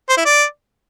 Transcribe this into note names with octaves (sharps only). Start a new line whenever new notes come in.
C5
E4
D5